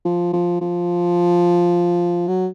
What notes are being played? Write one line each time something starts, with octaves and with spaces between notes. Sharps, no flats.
F3
F3
F3
F#3